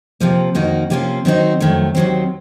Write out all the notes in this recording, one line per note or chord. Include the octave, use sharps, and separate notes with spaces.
C3 F3 A#3
F2 D#3 A#3 D#4 F#4
C3 F3 A#3 C#4 F4
D#3 F#3 C4 D#4 F#4
F2 D#3 F#3 A3
D#2 D#3 F#3 C4